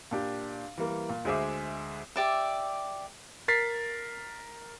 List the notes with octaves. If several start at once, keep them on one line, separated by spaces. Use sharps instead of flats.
A#2 D4 G4
E3 G3 A#3
A#2
D2 G#3 G#4 C5 E5 D6
G4 D5 E5
A#4 A6 B6 C7